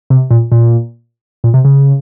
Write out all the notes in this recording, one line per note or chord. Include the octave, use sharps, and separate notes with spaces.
C3
A#2
A#2
A#2
C3
C#3